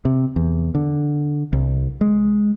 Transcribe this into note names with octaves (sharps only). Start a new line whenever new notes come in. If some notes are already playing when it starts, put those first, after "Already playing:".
C3
E2
D3
C2
G#3